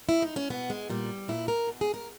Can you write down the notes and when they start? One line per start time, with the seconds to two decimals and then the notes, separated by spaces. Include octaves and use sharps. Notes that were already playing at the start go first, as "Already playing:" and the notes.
0.09 E4
0.22 D#4
0.36 C#4
0.50 B2 B3
0.70 G#3
0.90 A#2 G3
1.28 A#2 E4
1.48 A#4
1.67 B2
1.81 G#4
1.94 A#4